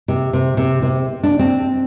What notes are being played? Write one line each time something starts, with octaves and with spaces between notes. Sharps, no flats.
C3
C3
C3
C3
D4
C4